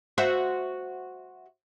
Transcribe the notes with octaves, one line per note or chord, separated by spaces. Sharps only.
F#4 C5 E5